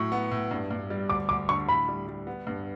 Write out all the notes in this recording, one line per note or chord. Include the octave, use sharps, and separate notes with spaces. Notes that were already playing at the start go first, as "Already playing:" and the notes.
Already playing: A2 F#3 C#6
B3
A2
G2
G2
G3
D2 D6
D2 D6
D3 C#6
A2 B5
G3
G3
B3
G2